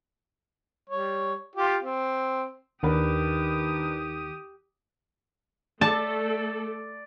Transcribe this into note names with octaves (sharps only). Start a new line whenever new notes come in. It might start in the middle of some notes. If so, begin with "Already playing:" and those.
G3 C#5
F4 G4
C4
D#2 D#3 D4 G4 A#4 B4 D#6
A3 A4 D5 A5